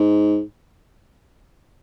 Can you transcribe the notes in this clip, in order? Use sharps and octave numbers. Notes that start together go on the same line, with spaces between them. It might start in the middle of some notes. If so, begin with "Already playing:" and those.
Already playing: G#2